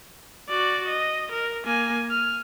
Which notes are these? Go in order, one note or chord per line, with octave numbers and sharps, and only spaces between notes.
F#4 D5
D#5
A#4
A#3 G#5
F6